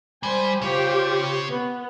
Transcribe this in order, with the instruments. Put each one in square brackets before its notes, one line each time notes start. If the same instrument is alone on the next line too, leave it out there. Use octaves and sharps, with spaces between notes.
[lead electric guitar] G3 [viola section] C5 G#5
[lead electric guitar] C#3 C#5 [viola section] F4 G4 C5
[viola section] B3